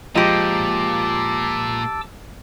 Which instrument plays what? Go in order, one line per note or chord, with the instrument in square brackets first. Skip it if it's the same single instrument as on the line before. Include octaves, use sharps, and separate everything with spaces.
[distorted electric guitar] A#2 [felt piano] F3 G#3 [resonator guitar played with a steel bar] G4 D#5 [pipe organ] A5 D6 E6